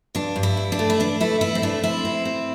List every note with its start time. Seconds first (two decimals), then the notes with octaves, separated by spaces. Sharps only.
0.15 G2 D4
0.36 G2
0.43 E4
0.57 G2
0.72 D4
0.79 A3
0.90 E4
1.00 E3 D4
1.20 A3 E4
1.41 E3 E4
1.55 C4
1.62 A3 D4
1.83 C4 E4
2.05 C4
2.25 C4